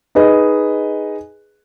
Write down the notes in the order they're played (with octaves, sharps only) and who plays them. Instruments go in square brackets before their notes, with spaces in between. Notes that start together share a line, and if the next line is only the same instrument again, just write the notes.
[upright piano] D#4 G#4 B4 D#5